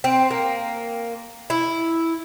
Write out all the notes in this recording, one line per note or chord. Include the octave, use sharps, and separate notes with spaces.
C4
A#3
E4